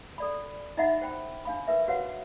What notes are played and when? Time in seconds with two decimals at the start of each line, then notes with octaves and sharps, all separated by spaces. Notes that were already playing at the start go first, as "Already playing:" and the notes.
0.18 A4 D5 B5
0.77 D#4 E4 D#5 E5 F#5 B5
1.02 C5 G5 B5
1.45 D4 F5 B5
1.67 A#4 B4 E5
1.88 F#4 B4 C#5 F5 F#5